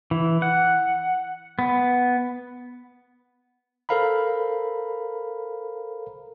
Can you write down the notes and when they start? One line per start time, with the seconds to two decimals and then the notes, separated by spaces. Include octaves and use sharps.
0.11 E3
0.42 F#5
1.59 B3
3.89 A4 A#4 C5 F5 A#5 B5